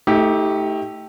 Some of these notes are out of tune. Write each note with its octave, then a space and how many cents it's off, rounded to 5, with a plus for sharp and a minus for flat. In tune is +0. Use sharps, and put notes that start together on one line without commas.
A3 +0 D#4 +35 G4 -5